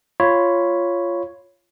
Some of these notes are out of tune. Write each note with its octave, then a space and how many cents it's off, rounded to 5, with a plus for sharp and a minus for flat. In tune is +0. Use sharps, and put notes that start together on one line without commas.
F4 -10 C#5 +0 B5 +0